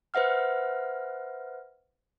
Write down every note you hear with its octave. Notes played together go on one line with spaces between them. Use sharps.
B4 C5 E5 F#5 F6